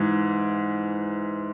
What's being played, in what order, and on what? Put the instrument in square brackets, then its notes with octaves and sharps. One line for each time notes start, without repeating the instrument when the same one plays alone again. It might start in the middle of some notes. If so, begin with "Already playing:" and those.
Already playing: [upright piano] G#2 E3